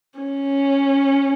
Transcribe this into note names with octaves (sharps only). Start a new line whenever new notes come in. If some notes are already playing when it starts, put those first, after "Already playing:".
C#4